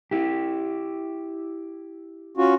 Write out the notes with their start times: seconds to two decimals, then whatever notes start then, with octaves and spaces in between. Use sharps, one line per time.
0.11 E4 G4
2.37 C#4 F4 F#4